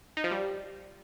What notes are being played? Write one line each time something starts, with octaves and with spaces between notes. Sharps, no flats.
D#4
F3
G3